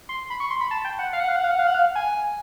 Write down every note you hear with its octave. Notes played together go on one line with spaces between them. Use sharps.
C6
B5
C#6
C6
B5
A5
G5
F#5
F5
F#5
F5
F#5
F5
F#5
F5
F#5
F5
G#5